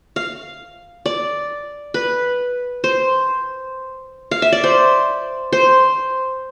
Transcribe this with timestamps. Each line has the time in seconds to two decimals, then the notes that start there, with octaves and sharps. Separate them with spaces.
0.16 F5
1.06 D5
1.94 B4
2.84 C5
4.31 F5
4.42 E5
4.52 D5
4.64 C5
5.52 C5